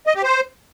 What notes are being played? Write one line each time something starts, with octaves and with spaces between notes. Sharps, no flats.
D#5
G4
C5